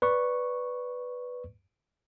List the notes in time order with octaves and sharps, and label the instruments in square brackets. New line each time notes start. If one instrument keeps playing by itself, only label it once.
[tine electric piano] B4 D5 C#6